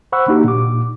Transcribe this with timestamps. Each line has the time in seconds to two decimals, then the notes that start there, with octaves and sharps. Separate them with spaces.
0.12 C5 F#5 B5 C#6 E6 F#6
0.28 A#3 D4 D#4 F#4 G4
0.44 A#2 D6